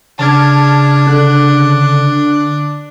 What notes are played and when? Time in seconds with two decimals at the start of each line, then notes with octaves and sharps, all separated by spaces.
0.19 C#3 D4 A5 F6 G#6
1.07 D3 F#6